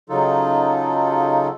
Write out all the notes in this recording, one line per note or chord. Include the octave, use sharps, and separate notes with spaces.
C#3 F#3 D#4 F4 A4